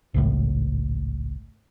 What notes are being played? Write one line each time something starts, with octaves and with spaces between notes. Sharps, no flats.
G#1 C#2 A2